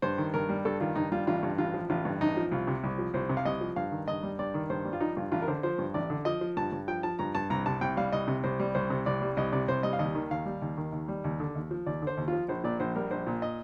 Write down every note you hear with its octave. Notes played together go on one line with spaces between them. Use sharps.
G2 C5
D#3
G2 A#4
G3
G2 A4
D#3 F4
G2 D#4
G3 F4
A1 F4
G2
A1 F4
F3
A1 F4
G2
A1 D#4
F3
C2 F4
C3
C2
F3
C2 C5
C3
F5
C2 D#5
F3
G2 F5
D#3
G2 D#5
G3
G2 D5
D#3
G2 C5
G3
F4
F3 D#4
G2 F4
A1 F4
A#4
D3 C5
F3 C5
G2
A1 D5
D3
F3 D#5
F3
G2 A5
G2
F3 G5
F3 A5
G2 A#5
G2 A5
C2 A#5
C3 A5
C2 G5
G3 F5
C2 D#5
C3
C2 C5
G3
C2 C5
C3
C2 D5
G3
C2 D#5
C3 D5
C2 C5
G3 D#5
F5
D#2 D#5
D#3
D#2 F5
G3
D#2
D#3
D#2
G3
D#2
D3
D#2
F3
D#2 D5
D3 C5
D#2
F3 F4
A#1 C5
A#2 D5
A#1 C5
G3 A#4
A#1 C5
A#2
D#5